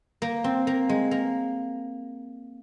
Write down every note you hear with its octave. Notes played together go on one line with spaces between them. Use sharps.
A#3
C4
A#3
G#3
A#3